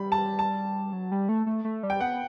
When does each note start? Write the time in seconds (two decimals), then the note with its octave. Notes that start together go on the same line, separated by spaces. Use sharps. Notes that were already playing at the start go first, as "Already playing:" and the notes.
Already playing: G3 B5
0.12 A5
0.39 A5
0.93 F#3
1.12 G3
1.29 A3
1.46 A3
1.64 A3
1.83 G3
1.90 G5
2.00 B3 F#5